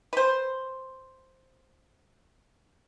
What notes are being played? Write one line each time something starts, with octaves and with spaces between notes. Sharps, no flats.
B4 C5